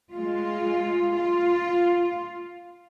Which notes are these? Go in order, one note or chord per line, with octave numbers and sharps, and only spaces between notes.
G#3 F4
F4